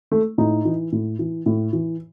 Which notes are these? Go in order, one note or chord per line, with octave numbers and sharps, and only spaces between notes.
A3
A2 D#4
E3
A2
E3
A2
E3